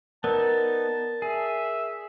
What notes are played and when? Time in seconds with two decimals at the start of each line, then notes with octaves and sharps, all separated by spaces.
0.24 B3 D#4 A#4 D5 A5
1.22 G#4 E5